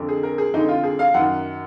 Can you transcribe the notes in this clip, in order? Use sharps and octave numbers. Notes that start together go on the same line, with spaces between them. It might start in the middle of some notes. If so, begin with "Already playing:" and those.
Already playing: F2 D3
G#4
A#4
G#4
F2 D3 D#4
F4
G#4
F5
F#2 D#3 F#5